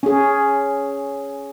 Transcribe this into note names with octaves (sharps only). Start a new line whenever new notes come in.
C#4 G#4